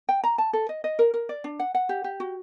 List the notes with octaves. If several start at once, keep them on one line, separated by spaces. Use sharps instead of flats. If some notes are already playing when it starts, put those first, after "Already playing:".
G5
A#5
A5
A4
D#5
D#5
A#4
A#4
D5
D4
F#5
F#5
G4
G4
F#4